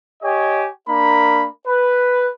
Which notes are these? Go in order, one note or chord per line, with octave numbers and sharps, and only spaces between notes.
G4 C#5 D#5 G#5
A#3 D4 A#4 B5
B4